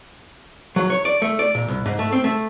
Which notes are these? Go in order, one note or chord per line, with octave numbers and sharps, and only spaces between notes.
F#3
C#5
D5
A3
D5
A#2
C2
G#2
A3
C4
A3